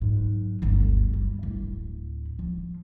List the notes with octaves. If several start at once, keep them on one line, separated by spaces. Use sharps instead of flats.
G#2 F#3
G1 D2
G3
D1 E4
F3